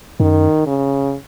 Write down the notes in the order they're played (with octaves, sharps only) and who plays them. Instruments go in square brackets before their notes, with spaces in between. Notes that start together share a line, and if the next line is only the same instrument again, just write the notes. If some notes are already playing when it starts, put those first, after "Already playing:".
[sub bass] F#2 [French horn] D#3
[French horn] C#3